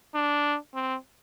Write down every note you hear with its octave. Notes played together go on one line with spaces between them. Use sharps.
D4
C4